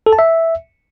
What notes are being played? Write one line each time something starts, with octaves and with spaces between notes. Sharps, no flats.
A4
A5
E5